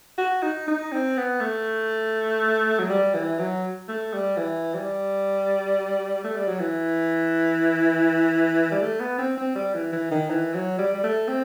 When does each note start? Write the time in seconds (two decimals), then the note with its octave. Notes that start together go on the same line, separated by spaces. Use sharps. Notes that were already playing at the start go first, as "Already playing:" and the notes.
0.18 F#4
0.42 D#4
0.67 D#4
0.92 C4
1.17 B3
1.40 A3
2.79 F#3
2.89 G3
3.14 E3
3.39 F#3
3.88 A3
4.13 G3
4.37 E3
4.74 G3
6.24 A3
6.36 G3
6.47 F#3
6.59 E3
8.71 G3
8.81 A3
9.00 B3
9.18 C4
9.37 C4
9.55 G3
9.74 E3
9.92 E3
10.11 D#3
10.30 E3
10.54 F#3
10.78 G3
10.94 G3
11.03 A3
11.28 C4